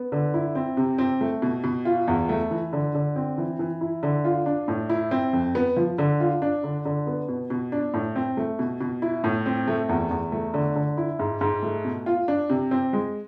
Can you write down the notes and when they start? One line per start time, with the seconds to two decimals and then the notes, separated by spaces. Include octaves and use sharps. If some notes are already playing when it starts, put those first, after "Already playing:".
Already playing: B3
0.12 D3
0.34 E4
0.55 C4
0.77 C3
0.98 C4
1.21 A3
1.42 B2
1.64 B2
1.85 F4
2.08 E2
2.29 A3
2.51 E3
2.73 D3
2.95 D3
3.16 C4
3.38 E3
3.59 E3
3.81 E4
4.03 D3
4.24 F4
4.46 D4
4.68 A2
4.89 E4
5.11 C4
5.33 F2
5.55 B3
5.77 F3
5.98 D3
6.20 F4
6.42 D4
6.64 D3
6.85 D3
7.07 B3
7.28 B2
7.50 B2
7.72 D4
7.94 A2
8.16 C4
8.37 A3
8.59 B2
8.81 B2
9.02 E4
9.24 A2
9.46 C4
9.68 A3
9.89 E2
10.11 E2
10.32 A3
10.54 D3
10.76 D3
10.97 E4
11.19 G#2
11.41 G#2
11.62 A3
11.85 B2
12.06 F4
12.28 D4
12.50 C3
12.71 C4
12.93 G#3